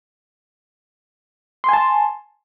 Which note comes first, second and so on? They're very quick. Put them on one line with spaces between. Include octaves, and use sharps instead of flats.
C6 G#5 A5